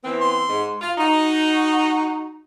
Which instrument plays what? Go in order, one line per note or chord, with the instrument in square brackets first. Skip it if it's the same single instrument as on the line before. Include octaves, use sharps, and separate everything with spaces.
[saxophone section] E3 B3 C4
[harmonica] C6
[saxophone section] G#2
F4
[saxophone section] D#4 [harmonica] F#4